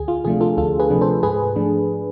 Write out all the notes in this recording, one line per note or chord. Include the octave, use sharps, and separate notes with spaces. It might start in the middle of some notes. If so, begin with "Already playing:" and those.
Already playing: D2 G#4
F4
C3 F3 A3 D4 G#4
F4 A4
D2 F4 A4
G#4 B4
C3 F3 A3 D4
A4 C5
G#2 G#4 B4
F3 A3 D4